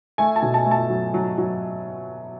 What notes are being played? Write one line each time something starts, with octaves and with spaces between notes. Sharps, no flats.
A3 G#5
A5
B2
A5
A3
A5
F#3
F#3
F#3